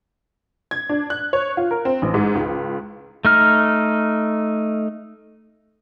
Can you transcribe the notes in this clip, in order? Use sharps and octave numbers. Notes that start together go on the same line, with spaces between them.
G#6
D4
F#6
C#5
F4
A#4
C4
A1
G#2
C#2
A3 D#4 F6